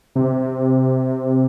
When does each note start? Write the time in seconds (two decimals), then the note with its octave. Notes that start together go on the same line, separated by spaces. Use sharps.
0.15 C3